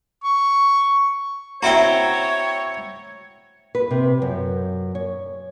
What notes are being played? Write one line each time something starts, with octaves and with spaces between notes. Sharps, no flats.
C#6
C4 E4 F#4 C#5 E5 G5 A#5
B4
C3
F#2
C#5